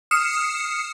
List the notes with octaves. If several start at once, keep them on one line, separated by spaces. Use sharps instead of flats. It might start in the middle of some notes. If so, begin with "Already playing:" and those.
D#6 F6 C7 C#7 E7